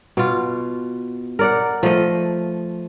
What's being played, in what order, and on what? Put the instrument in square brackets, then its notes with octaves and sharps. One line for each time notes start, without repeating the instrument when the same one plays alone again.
[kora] B2 F4
A#4 D5 F#5
F3 A3 D#5